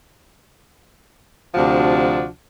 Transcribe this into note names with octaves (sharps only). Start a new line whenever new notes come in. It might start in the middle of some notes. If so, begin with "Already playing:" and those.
D2 C3 F3 D4 F#4